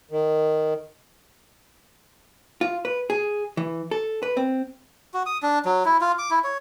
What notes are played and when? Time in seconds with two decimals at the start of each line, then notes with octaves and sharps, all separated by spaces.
0.11 D#3
2.61 F4
2.85 B4
3.10 G#4
3.57 E3
3.91 A4
4.23 B4
4.37 C4
5.14 F#4
5.26 D#6
5.43 D4
5.65 F#3
5.85 E4
6.01 F4
6.18 D6
6.31 E4
6.44 C#5